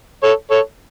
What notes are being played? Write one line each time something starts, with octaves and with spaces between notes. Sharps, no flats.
A4 C#5
A4 C#5